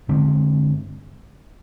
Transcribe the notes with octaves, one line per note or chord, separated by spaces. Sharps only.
G2 D3 G#3 C4